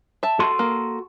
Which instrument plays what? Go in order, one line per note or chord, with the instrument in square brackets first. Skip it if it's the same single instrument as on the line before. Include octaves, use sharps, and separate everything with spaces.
[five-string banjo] E5 A5
[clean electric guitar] F#4 A4 C6
[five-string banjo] A#3